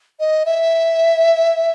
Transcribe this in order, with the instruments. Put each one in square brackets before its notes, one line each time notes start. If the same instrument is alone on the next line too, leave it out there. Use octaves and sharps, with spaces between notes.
[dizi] D#5
E5